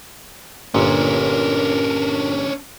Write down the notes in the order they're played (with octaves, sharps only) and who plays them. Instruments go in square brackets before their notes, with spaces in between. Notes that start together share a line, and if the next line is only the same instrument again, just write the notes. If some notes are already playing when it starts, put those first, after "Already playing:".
[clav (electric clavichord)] G1 A#2 [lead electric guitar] C#4 D4 [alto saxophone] A#4